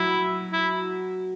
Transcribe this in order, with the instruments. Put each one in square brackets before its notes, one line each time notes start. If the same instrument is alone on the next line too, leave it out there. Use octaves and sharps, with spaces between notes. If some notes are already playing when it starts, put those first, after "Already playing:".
Already playing: [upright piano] F#3 [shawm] E4
[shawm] E4